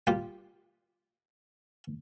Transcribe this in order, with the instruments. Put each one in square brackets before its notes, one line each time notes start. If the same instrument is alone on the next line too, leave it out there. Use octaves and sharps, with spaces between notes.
[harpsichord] G3 A#3 F4 G4